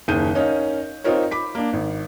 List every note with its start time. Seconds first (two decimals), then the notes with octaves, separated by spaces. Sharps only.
0.08 F#1 D#2 G#4 G6 D#7
0.35 C#4 D#4 A#4 F5
1.04 C4 D#4 F4 A#4 C#5
1.31 B5 D6 B6
1.55 A#3 D4
1.73 G#1